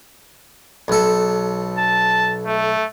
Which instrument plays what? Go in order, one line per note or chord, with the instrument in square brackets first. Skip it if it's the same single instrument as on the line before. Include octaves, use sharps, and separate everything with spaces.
[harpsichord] B1 A4
[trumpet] A5
A3